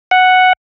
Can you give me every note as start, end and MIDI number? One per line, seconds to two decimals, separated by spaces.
0.11 0.53 78